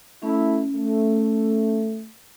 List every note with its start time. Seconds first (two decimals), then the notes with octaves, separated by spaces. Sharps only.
0.22 A3 C#4 E4
0.74 A3